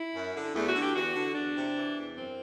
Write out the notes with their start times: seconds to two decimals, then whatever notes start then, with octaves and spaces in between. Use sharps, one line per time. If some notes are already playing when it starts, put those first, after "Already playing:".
Already playing: E4
0.14 F#2
0.35 D3
0.54 E2 A3
0.68 F#4
0.75 D3
0.81 G4
0.95 E2 F#4
1.15 D3
1.35 E2 D4
1.56 C3
1.75 E3
1.96 E2
2.16 F#2 C4